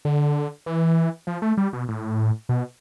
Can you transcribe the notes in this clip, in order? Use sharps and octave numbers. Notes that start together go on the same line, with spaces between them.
D3
E3
F3
A3
G3
B2
A2
B2